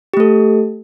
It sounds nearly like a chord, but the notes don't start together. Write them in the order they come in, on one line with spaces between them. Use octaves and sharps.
G4 A3 A4